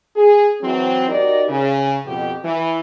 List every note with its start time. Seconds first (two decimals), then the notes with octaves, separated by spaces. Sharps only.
0.16 G#4
0.62 E3 F#3 C4
1.09 D#4 F#4 G4 A#4 D5 D#5
1.49 C#3
2.05 F2 B2 G4
2.43 E3